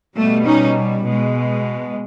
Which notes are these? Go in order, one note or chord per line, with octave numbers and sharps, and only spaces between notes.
B2 G3 A3
C#4 D#4
B2 G#3